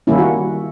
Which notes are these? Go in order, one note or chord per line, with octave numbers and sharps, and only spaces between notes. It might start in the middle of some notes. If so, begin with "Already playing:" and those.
D#3 G3 A#3 C#4 E4
F#4